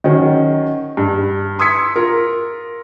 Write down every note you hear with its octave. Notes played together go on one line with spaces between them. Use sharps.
D#3 F#3 C#4
G2
C6 D#6 E6 G#6 B6 C#7
F4 A#4